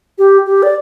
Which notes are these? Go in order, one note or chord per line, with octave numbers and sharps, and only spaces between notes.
G4
G4
D5